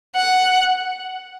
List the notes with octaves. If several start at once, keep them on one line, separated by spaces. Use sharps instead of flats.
F#5